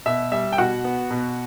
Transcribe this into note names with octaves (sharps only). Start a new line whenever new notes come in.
B2 E5
G3 E5
G5
B2 F#4 F#5
B3
B2